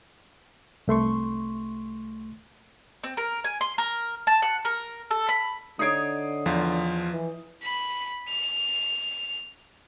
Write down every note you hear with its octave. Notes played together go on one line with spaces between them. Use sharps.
C2 A3 C6 C#6
C4
A#4
G#5
C6
A#4
A5
F#5
A#4
A4
B5
D3 D#4 C#5 D#6 C7 D7
E2 F3 F4
E3
B5
F7